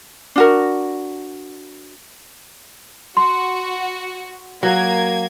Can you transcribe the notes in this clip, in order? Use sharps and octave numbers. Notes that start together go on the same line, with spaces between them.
D4 F#4 A#4
F#4 C6
F#3 A#3 G#6